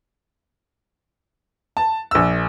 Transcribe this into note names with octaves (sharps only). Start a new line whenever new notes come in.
A5
A#1 E6